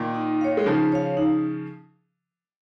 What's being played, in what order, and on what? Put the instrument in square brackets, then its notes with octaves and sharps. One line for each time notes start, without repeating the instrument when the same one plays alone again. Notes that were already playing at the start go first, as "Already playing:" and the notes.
Already playing: [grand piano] A#2 D#3
[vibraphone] D#4
C#5 F5
[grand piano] G#3
[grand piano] C#3 F3 [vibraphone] D#4
[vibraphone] C#5 F5
D#4